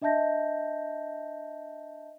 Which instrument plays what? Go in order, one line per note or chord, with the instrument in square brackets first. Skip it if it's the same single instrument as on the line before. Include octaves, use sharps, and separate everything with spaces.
[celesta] D4 D#5 E5 A5 G6 A#6